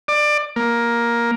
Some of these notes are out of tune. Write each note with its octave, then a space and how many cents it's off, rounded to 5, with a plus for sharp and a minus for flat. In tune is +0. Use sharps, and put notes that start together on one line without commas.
D5 +20
A#3 +10